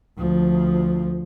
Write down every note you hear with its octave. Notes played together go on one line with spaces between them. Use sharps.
D2 F3